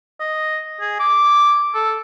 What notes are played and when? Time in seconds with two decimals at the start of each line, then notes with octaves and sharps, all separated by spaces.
0.20 D#5
0.81 G#4
1.00 D6
1.74 A4